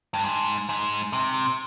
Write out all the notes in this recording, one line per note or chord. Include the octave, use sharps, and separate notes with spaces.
G2
G#2
G#2
C3